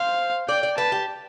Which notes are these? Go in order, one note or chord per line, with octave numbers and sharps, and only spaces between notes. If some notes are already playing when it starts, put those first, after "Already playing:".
Already playing: C5 F5
D5 G5
D5
B4 A5
G4